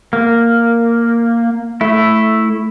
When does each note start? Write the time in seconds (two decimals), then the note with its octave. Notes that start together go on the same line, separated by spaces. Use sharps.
0.13 A#3
1.81 A3 E4